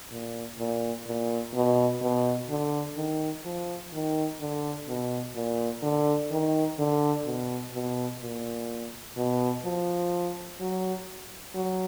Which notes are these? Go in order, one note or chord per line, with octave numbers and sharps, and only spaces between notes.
A#2
A#2
A#2
B2
B2
D3
D#3
F3
D#3
D3
B2
A#2
D3
D#3
D3
B2
B2
A#2
B2
F3
F#3
F#3